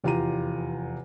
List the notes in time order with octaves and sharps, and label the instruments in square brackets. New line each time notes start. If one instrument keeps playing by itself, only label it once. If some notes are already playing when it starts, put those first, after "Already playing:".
[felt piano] F1 E2 F4 G4 A#5 D#7